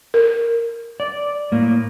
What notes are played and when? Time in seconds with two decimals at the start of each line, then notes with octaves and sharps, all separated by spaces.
0.14 A#4
1.00 D5
1.52 A2 A#3